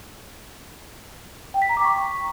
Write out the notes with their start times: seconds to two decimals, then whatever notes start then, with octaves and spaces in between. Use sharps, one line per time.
1.54 G5
1.62 B6
1.69 A#5
1.77 D6
1.84 C#6